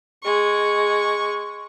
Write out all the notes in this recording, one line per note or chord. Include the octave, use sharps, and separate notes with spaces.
G#3 C#6